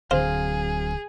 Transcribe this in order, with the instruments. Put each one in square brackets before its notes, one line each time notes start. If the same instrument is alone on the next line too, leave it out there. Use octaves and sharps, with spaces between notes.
[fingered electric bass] D1 D3 [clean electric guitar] F#3 C4 F5 [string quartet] G#4 [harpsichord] C5